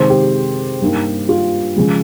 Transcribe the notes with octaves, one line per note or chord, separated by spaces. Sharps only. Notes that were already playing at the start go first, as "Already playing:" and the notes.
Already playing: C3 D#3 G#3 D#4 C5
G4
G2 G3 A#3 D#4
F4
C#3 F3 G#3